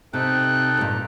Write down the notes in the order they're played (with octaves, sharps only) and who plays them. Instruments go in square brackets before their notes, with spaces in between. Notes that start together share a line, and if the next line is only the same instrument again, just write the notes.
[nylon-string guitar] C3 [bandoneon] D#4 A4 G5 [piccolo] F#6
[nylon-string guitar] G2 A#2